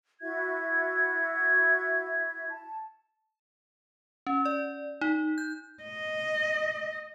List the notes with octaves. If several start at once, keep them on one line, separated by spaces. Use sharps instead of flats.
E4 F#4 E5 G#6
A5
C#4
D5
D#4
G6
D#5